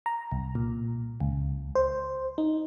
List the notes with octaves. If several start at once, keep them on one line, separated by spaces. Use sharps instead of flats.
A#5
C2
A#2
C#2
C5
D#4